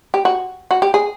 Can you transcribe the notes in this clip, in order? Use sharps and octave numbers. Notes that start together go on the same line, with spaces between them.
G4
F#4
F#4
G4
G#4